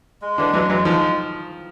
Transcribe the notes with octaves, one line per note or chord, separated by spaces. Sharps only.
G#3
D3 E3 D4
E3 F#3 G#3
E3 F#3 G#3
D#3 F3 G#3